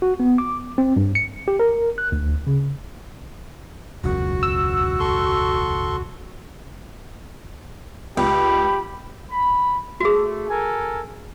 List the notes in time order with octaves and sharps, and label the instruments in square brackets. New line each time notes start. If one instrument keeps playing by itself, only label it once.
[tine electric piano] F#4
B3
D6
C4
G2
C#7
G4
A#4
F#6
D2
C#3
[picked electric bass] E1 C#2 F#2 [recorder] F#4
[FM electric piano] E6
[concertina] A4 C6 C#6
[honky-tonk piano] C#2 [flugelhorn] G4 [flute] B5
[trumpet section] B5
[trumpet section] A3 [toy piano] F#4 G#4
[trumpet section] A4 A#4 G#5